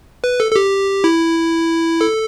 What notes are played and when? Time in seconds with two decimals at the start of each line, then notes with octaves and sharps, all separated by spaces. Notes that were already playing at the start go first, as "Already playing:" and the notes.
0.24 B4
0.40 A4
0.51 A4
0.56 G4
1.04 E4
2.01 A4